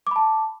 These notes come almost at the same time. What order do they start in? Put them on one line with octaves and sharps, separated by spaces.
D6 B5 A5